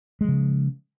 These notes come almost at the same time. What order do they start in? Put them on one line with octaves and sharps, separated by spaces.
G#3 F3 C#3